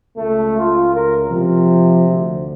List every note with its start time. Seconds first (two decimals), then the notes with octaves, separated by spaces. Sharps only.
0.17 C#2 A3
0.58 F4
0.94 A#4
1.30 C3 F3
2.09 D2